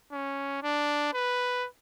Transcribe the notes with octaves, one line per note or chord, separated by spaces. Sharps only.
C#4
D4
B4